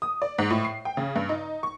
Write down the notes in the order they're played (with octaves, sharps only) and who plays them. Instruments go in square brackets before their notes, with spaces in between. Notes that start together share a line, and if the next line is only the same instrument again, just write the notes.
[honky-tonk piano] D#6
D5
G#2
A2
C7
G5
C#3
G2
D#4
C#6